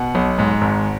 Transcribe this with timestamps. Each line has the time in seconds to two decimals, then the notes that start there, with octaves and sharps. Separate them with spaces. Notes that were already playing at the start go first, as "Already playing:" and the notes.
Already playing: B2 F#5
0.15 B1
0.39 G#2
0.61 G#1